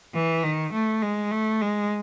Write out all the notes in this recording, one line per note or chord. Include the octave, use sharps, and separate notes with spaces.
E3
D#3
A3
G#3
A3
G#3